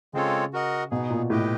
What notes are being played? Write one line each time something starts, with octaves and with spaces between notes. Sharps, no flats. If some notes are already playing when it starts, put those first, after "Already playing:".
C#3 G#3 C4 F4 A4 C#5
F#4 A#4 D#5 F#5
B2 B3 D#4 G#4
A#2
A2 G4 B4 D#5 G5